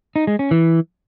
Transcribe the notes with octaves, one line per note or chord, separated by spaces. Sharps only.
D#4
G#3
C#4
E3